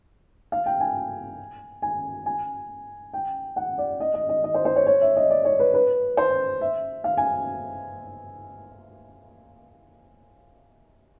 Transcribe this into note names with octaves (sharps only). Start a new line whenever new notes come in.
F5
G5
G#5
G#5
G#5
G5
F#5
D5
D#5
D#5
D#5
D#5
C5
C5
C#5
C#5
E5
D#5
D5
C#5
B4
B4
C5
E5
F5
G#5